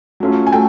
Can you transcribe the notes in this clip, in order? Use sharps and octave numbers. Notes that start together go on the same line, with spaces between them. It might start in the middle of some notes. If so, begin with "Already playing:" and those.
F#3 A3 C#4 F4
G#5
F#3 A3 G5